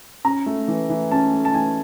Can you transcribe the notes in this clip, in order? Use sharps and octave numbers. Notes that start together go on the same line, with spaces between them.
C#4 A#5
A3
E3
E3
C#4 A5
A3
A5
E3 G#5